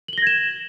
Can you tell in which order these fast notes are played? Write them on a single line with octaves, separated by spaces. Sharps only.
F#7 G7 A#6 G#6 E7